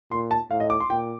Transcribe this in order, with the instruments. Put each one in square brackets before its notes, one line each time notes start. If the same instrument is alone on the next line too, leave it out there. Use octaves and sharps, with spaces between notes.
[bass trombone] A#2 [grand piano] C6
[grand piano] A5
[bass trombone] A2 [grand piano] F5
[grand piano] D#5
D6
C6
[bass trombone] A#2 [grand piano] G5